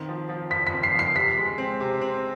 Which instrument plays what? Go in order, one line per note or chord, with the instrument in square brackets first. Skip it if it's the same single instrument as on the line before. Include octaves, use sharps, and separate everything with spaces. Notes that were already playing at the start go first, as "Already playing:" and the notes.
Already playing: [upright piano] D#3 C4
F3
F3
[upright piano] F3 [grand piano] B6
[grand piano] B6
[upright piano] C4
[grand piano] C7
[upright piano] F3
[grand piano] C7
[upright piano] C3 [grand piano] B6
[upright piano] G#3
C4
C3
C4